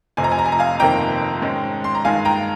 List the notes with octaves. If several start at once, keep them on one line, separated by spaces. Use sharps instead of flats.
F1 F2 C3 G#5
A#5
G#5
A#5
G#5
A#5
F5 G#5
G1 F2 C3 D#3 A#3 G5 A#5
G#2 D#3 G#3 C#4
C6
A#5
G2 D#3 G#3 D#4 F5 G#5
G5 A#5